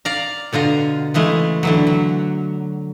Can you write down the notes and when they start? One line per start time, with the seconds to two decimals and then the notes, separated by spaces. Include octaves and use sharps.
0.05 D5 F5 A#5
0.53 B2 D3 F4 A#5
1.14 C#3 E3 G#3 A3
1.63 D3 E3 F#3
1.87 F#3